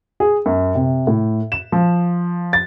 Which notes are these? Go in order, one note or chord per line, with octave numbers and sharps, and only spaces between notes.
G#4
F#2
C3
A2
E7
F3
A6